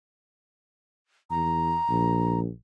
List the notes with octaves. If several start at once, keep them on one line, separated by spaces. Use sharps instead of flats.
E2 A#5
A#1